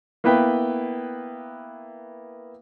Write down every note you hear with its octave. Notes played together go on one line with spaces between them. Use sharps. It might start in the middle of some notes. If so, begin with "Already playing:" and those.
A#3 B3 E4 B4 G5